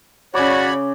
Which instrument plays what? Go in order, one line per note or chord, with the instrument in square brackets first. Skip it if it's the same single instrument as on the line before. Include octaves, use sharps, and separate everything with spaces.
[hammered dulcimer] C#3 D6 [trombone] F#4 [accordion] C#5 D5 B5